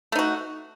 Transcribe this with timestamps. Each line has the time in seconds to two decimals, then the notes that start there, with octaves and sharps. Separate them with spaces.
0.12 A3
0.15 D#4
0.19 F#4